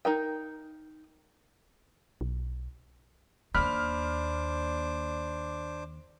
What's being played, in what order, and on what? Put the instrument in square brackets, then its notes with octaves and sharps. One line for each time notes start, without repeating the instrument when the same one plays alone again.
[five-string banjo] D#4 A#4 G5
[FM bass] B1
[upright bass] D#2 A#3 [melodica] D4 C5 D6 [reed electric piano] B5 [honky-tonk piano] F6